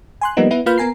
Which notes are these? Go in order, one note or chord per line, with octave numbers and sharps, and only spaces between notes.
G#5 C6 F#6
F3 G3 A#3 B3 D#4
B3 E4 B4
A#3 F4 B4 B5 F6 G6
B3 A#4 G#5 A#5 C7